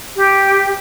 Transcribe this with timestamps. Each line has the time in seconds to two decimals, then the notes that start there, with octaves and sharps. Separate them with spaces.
0.15 G4